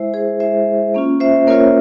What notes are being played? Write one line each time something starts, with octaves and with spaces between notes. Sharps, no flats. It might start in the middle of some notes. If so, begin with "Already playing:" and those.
Already playing: G#3 E4 C5 E5
G#4 C5
G#3 E4 C5 E5
A#3 C#4 F4
C5 E5
A#3 C#4 F4 A#4 C#5